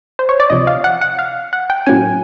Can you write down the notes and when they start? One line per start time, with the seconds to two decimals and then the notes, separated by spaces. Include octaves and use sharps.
0.19 C5
0.29 C#5
0.40 D5
0.50 D2 C3 F3 D#5
0.67 F5
0.84 F#5
1.01 F#5
1.19 F5
1.53 F#5
1.70 G5
1.86 A2 F#3 A#3 C#4 G#5